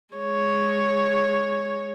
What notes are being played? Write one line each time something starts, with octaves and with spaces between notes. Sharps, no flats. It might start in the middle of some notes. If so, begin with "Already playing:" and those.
G#3 C#5